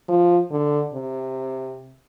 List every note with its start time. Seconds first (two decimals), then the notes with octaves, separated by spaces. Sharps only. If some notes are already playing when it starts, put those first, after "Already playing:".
0.09 F3
0.51 D3
0.94 C3